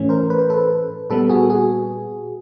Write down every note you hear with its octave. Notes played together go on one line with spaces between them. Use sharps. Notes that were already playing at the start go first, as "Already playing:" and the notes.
Already playing: A2 E3 A3 C#4
A#4 C5
B4
C5
A4 B4
A#2 G3 B3 A4 B4
F#4 G#4
F#4 G#4